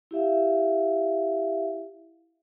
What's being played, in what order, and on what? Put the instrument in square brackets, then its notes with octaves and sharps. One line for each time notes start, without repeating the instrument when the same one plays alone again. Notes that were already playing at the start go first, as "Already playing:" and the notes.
[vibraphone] E4 G4 E5 F5